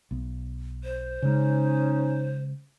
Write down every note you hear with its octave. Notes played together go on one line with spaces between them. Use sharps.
B1 B3
C5
C#3 G#3 C#4 D#4